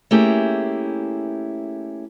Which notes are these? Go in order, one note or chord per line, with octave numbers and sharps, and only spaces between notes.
A3 A#3 C#4 E4 G4 G#4